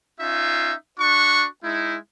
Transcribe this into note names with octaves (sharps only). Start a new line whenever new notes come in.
C#4 D#4 F4 E5
D4 F#4 C#6
G#3 D#4 E4